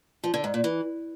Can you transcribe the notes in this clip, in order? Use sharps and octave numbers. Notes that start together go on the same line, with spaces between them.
F3
D3
G#2
A#2
E3